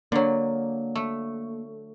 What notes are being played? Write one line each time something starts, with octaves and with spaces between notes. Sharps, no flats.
D3 F#3 A#3
A3